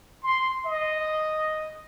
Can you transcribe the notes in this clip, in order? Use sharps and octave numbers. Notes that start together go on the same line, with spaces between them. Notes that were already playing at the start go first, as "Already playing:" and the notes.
C6
D#5